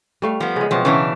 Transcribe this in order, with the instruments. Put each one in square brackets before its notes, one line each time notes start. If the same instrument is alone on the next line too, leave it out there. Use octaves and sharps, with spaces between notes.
[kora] G3 A3 F5
[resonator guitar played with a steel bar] F3 B3 [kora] G4
[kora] C#3 G#3
[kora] B2 F#3 C4 [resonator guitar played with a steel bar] F3
[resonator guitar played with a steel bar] C#3 E3 D4 [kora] F#3 E4 C#5